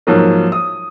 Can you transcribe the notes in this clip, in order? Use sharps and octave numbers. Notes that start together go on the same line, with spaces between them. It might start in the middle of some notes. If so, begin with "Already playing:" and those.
G#2 F3 F#3 A#3
D#6